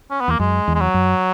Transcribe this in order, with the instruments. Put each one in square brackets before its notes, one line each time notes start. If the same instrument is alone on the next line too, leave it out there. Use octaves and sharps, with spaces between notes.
[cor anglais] C#4
B3
[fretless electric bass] E2 [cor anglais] A#3
[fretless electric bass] F#2 [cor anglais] G#3
[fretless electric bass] E2
[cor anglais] G#3
F#3
[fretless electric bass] F#2